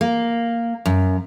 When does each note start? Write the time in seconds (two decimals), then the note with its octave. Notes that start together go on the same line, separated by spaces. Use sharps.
0.01 A#3
0.86 F#2